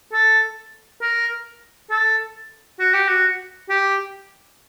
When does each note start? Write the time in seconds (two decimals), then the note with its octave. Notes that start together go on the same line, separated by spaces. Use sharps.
0.13 A4
1.02 A#4
1.90 A4
2.80 F#4
2.94 G4
3.08 F#4
3.69 G4